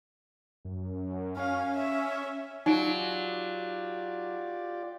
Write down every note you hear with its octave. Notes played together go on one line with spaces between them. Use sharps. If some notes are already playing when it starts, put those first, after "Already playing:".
F#2
C#4 F5
E5
F#3 D#4 F4 G4 D5 D7